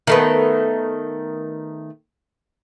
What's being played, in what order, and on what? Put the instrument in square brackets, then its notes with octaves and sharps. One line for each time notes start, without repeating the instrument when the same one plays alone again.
[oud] D#3 A3 B3